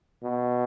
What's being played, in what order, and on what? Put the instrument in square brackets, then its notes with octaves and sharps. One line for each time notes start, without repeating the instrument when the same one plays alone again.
[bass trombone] B2